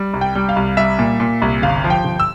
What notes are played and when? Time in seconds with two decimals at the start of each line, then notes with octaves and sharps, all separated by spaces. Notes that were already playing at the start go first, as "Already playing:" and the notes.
Already playing: G3
0.14 C2
0.21 G5
0.35 G3
0.49 F5
0.56 C2
0.77 G3 E5
0.99 A#2
1.20 A#2
1.42 C2
1.62 G1 F5
1.84 F3
1.90 G5
2.04 G1
2.20 E6